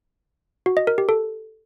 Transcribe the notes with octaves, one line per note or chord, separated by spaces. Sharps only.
F#4
D#5
A#4
G4
A4